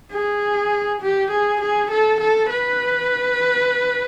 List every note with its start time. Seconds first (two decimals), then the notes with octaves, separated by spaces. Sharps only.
0.12 G#4
1.01 G4
1.31 G#4
1.61 G#4
1.91 A4
2.20 A4
2.50 B4